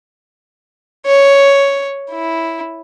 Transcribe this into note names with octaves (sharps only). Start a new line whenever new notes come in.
C#5
E4